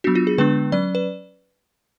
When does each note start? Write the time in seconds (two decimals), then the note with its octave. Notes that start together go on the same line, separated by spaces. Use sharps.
0.04 F#3 B3 D4 F#4
0.15 F4
0.27 G#4
0.38 D3 G#3 B3 D4 B4
0.72 F#3 C#4 D5
0.95 B4